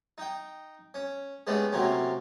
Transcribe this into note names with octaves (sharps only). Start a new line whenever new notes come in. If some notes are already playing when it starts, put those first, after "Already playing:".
D#4 G5
C#4
G#3 A3 B3 C#4 D4 G4
A2 C3 F#3 A#3 C4 C#4